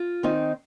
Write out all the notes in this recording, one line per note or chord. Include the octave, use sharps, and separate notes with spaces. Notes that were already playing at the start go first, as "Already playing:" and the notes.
Already playing: F4
D#3 C4 D#4